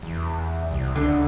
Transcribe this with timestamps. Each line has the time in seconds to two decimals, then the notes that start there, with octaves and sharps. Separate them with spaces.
0.02 E2
0.70 C2
0.96 C#2 D3